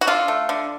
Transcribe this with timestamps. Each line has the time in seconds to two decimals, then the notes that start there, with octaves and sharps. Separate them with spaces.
0.01 F#4
0.07 D3 F4
0.28 A3
0.49 D3